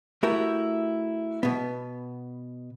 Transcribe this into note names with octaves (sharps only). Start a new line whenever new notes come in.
A3 E4 F#4 G4 A#4
B2 B3